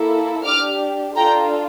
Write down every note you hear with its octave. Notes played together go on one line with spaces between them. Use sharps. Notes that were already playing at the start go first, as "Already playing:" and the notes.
Already playing: A#3 E4 A4
D4 G4 D6 F6
D4 F4 A4 G5 A#5